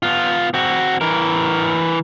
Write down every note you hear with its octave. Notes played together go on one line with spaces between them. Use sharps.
B3 F4
C4 F#4
E3 A#4